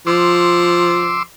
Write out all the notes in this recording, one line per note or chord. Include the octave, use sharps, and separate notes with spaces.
F3 C6 D6 E6